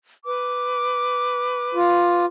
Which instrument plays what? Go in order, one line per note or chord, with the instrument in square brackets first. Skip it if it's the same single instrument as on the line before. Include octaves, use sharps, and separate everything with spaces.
[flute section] B4 D6
[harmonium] F4